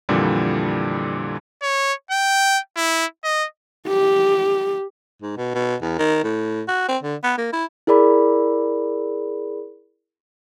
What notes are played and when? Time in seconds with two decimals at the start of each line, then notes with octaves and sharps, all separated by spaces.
0.09 F2 A#2 D3 E3 G3
1.62 C#5
2.11 G5
2.76 E4
3.24 D#5
3.88 G4
5.22 G#2
5.37 B2
5.55 B2
5.82 E2
5.99 D#3
6.24 A2
6.68 F#4
6.89 C4
7.03 D3
7.23 B3
7.38 A#3
7.53 E4
7.87 E4 G#4 A#4 D5 B5